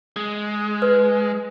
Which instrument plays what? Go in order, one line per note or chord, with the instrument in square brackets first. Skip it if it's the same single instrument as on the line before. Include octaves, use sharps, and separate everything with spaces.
[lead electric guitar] G#3
[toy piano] B4